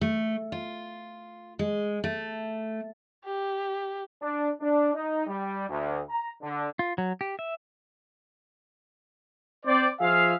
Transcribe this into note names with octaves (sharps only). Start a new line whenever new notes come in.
A3
F4
G#3
A3
G4
D4
D4
D#4
G3
D2
A#5
D3
F4
F#3
G4
E5
C4 C5 D5
F3 F4 G#4 E5 F5